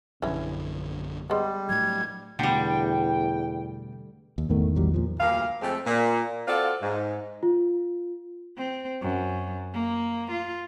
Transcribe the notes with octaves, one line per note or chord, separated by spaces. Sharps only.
A#1 F#2 D3 E3 C#4
G3 G#3 B3
A2 F#3 G#6
E2 B2 D3 G3 A3 G5
D#2
G1 E2 A2 D#3 A3
A#1 F#3 G3
A#2 F3
D2 G2 A#2 A#3 F5
F2 G#3 A3 C4
A#2
C4 F4 F#4 A4 D5 F5
G#2
F4
C4
F#2
A#3
F4